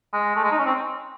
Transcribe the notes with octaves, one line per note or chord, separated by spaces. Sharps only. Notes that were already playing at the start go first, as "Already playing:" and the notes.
G#3
A3
G#3
D#4
C#4
C4